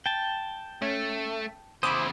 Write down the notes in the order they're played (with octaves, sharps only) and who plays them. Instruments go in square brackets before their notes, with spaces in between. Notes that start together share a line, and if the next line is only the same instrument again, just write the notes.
[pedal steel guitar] G5 A5
[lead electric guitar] A3 [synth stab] C#4
[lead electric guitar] E2 C#3 [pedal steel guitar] E4 C5 [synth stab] B5 D6 D#6